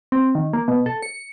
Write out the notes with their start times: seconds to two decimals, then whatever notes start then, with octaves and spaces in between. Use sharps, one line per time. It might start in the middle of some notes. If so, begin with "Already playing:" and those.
0.12 C4
0.35 D#3
0.53 A#3
0.68 B2
0.86 A4
1.02 C#7